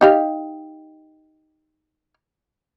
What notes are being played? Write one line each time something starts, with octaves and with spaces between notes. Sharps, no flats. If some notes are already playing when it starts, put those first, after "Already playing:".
D#4 G4 F5